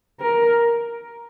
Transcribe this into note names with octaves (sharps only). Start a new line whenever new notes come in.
A#4